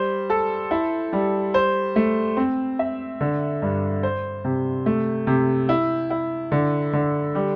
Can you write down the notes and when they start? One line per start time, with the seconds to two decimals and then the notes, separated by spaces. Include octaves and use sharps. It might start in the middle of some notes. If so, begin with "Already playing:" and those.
Already playing: G3 C5
0.30 A4
0.71 E4
1.13 G3
1.54 C5
1.96 A3
2.37 C4
2.79 E5
3.21 D3
3.62 G2
4.03 C5
4.45 C3
4.86 A3
5.27 C3
5.69 E4
6.10 E4
6.52 D3
6.93 D3
7.35 G3